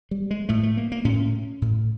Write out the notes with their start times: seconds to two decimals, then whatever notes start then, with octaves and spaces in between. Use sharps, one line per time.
0.11 G3
0.31 G#3
0.49 A2 A3
0.63 A3
0.77 A#3
0.92 A#3
1.05 A2 C#4
1.62 A2